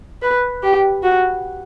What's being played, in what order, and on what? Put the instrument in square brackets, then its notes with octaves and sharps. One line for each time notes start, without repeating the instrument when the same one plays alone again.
[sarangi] B4
G4
F#4